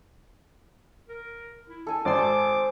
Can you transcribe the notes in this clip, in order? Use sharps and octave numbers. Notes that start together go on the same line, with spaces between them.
A#4
E4
D4 A4 G#5
G#1 C5 D5 C6 D6